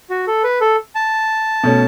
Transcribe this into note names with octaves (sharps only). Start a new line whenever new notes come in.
F#4
A4
B4
A4
A5
B2 A3 C#4